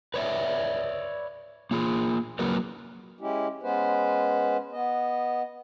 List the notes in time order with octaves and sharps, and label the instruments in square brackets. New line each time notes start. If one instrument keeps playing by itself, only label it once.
[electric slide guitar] B4 C#5 D5 E5
A#3 F4 G#4
F#3 A#3 F#4 A#4 B4
[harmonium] G#3 C#4 E4 G4
G#3 B3 C#4 B4 C5
B3 D#5